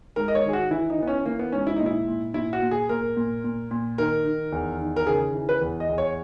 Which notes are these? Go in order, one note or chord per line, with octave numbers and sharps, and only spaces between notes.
G#2 A#4
D#5
C#5
D#3 G#4
F#4
E3 E4
D#4
E3 B3
C#4
E3 A#3
B3
G#2 C#4
E4
A#2 D#4
E4
A#2
A#2 E4
F#4
A#2
G#4
A#2 A#4
A#2
A#2
A#2
D#3 A#4
D#3
E2
D#3
A#4
C#3 G#4
E3
B4
E2
D#5
E2
C#5